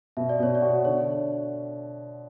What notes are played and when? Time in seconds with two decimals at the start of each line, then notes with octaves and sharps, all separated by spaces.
0.17 B2 E5
0.29 D5
0.40 B2 C#5
0.55 D5
0.62 F#4
0.85 D3 C#5